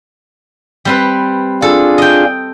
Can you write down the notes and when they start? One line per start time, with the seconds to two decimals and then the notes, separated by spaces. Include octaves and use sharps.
0.85 G3 C4 B4
1.62 D4 F4 G#4 A4
1.98 D#5 G5